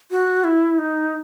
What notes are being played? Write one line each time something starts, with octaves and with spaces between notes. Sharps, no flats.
F#4
E4
D#4